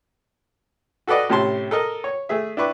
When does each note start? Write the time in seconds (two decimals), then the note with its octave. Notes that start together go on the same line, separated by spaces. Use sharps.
1.07 F#4 A4 B4 D5 D#5
1.29 A2 C3 C#4 G4 A5 C6
1.71 A4 A#4 D#5
2.04 C#5
2.29 A3 G#4 E5
2.57 D4 E4 B4 C#6 D6